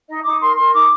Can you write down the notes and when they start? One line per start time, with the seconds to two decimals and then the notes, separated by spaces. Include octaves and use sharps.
0.08 D#4 D#5
0.24 D#4 D6
0.41 A#4 C6
0.57 A#4 C6
0.73 D#4 D6